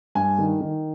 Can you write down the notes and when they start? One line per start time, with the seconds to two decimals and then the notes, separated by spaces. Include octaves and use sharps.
0.15 G2 G#5
0.38 D#3
0.61 D#3